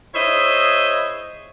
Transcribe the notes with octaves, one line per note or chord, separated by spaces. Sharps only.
E4 G#4 C5 C#5 D#5 E5